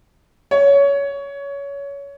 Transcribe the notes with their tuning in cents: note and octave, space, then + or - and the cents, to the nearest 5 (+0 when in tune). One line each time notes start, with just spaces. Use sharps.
C#5 +20